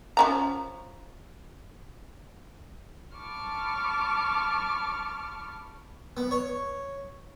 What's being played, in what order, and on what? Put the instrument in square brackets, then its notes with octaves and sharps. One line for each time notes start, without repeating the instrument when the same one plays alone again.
[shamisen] F3 C#4 A#5
[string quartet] A5 B5 C#6 D6 F6
[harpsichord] B3
C#5